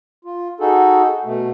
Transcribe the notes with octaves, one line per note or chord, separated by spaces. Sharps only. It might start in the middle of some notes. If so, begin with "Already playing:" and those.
F4
D#4 F#4 G#4 A4
B2 A3